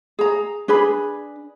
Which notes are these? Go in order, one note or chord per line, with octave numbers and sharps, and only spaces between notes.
G#4 A#5
D4 G#4 B4 B5